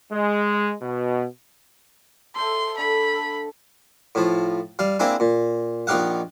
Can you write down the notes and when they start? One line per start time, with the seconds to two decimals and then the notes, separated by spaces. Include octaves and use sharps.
0.12 G#3
0.82 B2
2.36 A4 C5 E5 C6
2.78 D3 B5
3.13 A4
4.15 A2 F3
4.79 G3 F5
4.99 A#3 C4 D4 E4 G#4
5.20 A#2
5.87 A#1 D#4 G4 F5 F#5